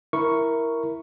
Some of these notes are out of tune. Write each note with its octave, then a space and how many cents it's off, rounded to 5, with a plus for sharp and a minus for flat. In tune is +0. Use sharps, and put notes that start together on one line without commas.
E4 +0 A#4 +0 C#6 +0